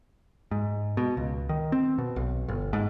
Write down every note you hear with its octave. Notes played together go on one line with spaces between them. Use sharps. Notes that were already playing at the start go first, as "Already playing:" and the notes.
G#2
B2
C#2
D#3
C4
B2
B1
G1
G#2